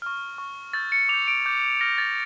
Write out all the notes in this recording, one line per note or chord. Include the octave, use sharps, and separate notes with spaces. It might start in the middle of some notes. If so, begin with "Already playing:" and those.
C#6 F6
C#6 F6
C#6 E6 G6 A6
C#7
D6 G6 F7
D7
D6 G6
D6 F6 A#6
A6